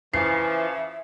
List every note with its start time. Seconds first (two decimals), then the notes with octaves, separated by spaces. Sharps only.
0.14 C#3 E3 F3 E5 C7